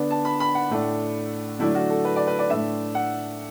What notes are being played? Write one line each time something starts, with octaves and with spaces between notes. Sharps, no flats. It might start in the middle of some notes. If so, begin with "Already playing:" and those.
Already playing: D3 B3 D4
A5
B5
B5
F#5
A2 A3 D4
D3 F#3 A3 D4 E4
F#4
A4
B4
D5
B4
D5
A2 A3 D4 E5
F#5